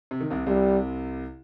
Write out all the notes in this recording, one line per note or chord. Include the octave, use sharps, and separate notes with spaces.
C3
D#3
C2 C3
C2 C3 G3